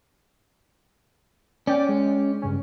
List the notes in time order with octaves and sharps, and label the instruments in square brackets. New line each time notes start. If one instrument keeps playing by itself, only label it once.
[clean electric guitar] C#4 [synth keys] D5 G5 D6
[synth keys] G#3
G2 C#3 C#4